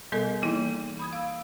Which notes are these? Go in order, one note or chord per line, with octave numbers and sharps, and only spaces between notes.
B2 G3 B3 A4 A#4 D#5
E3 A#3 D#4 E4
B5 D#6 G#6
F5 E6